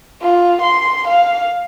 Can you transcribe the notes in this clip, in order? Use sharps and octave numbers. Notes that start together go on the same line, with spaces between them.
F4
C6
F5